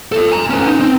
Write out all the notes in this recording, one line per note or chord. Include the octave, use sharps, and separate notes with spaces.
F4 A4
G#5 A#5
C#4 B4
D#4
C4